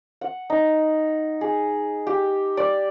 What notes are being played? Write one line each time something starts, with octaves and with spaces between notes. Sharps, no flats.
F#5
D#4
G#4
G4
D5